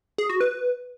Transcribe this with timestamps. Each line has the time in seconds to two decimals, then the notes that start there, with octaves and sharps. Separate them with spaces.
0.18 G#4
0.29 F#4
0.41 B4